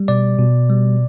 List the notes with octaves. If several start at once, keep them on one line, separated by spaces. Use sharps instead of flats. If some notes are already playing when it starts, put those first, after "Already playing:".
Already playing: G3
B2 D5
B2
G3